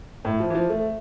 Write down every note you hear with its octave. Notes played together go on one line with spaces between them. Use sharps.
A2
F3
E3
F3
A3